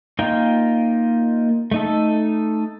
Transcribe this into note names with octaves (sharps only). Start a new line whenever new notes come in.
A#3 D#4 F4 A#4 G5
A3 D#4 A4